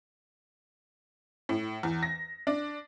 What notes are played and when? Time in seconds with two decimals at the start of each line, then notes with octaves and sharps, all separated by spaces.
1.49 A2
1.83 E2
2.03 A#6
2.47 D4